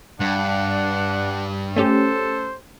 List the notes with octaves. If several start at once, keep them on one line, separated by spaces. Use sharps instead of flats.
G2 D4 F#5
A3 C#4 G4 A4 C5